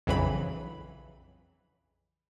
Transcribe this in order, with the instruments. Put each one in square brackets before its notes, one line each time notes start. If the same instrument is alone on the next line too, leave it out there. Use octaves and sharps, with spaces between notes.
[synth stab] A#1 F2 C#3 E3 F#3 B5